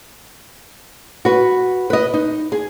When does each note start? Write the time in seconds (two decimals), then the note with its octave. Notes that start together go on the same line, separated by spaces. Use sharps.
1.25 F#4 B4
1.90 B4 D#5
2.14 D#4
2.52 G#4